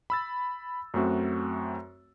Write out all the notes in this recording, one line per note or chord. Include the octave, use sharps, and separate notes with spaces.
B5 E6 A6
F#2 A3 C4 F#4